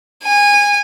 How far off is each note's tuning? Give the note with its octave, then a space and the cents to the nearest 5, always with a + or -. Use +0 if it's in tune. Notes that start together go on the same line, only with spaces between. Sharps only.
G#5 -20